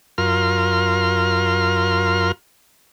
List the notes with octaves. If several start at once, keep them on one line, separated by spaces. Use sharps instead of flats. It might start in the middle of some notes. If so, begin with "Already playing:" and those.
F#2 F4 A#4 C6 F6